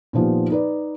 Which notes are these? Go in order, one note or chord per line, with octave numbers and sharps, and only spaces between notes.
A#2 D#3 F3 B3 G4
D#4 B4 D5